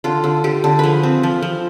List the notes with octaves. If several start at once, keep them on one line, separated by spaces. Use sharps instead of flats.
D3 F4
D3
D3 G4
D3
F3 G#4 B4
C4
F3
F3